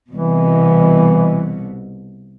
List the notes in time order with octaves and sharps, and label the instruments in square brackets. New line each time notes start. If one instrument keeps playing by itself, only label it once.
[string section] C2 B2 [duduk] E3